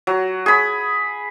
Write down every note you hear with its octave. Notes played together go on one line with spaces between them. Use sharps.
F#3
G#4 B5